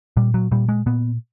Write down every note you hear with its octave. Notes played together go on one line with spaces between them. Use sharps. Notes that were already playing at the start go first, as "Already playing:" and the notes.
A#2 G3
F#3
A#2 G3
G#3
A#2 B3